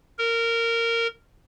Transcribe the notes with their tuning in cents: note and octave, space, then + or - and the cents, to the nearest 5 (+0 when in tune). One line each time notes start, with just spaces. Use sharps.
A#4 -15